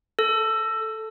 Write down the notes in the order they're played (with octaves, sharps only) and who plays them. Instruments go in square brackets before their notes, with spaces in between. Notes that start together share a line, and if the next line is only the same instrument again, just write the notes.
[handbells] A4